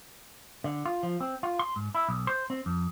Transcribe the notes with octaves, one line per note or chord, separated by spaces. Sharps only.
D3
F4
F3
C4
F4
C6
G#2
E4
B1
C5
C4
F2